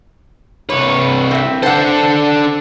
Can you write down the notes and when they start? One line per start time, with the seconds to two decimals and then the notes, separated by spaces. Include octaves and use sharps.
0.70 C2 B4 C#5
1.31 C4 E5
1.63 D4 A4 C5 F#5